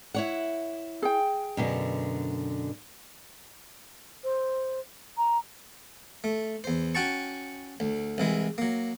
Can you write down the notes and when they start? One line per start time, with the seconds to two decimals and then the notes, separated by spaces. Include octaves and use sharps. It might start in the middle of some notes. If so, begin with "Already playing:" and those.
0.14 E4 C#5 F#5
1.02 G#4 G5
1.57 F#2 B2 D3
4.24 C5
5.17 A#5
6.24 A3
6.64 E2 C5
6.95 C#4 F#4 F#5 G5 A5 C#6
7.80 D2
8.18 C2 E3 G#3
8.58 F#3 A#3